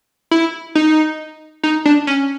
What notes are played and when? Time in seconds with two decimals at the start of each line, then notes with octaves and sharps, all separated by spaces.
0.31 E4
0.75 D#4
1.63 D#4
1.85 D4
2.07 C#4